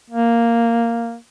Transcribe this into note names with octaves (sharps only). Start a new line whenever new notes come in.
A#3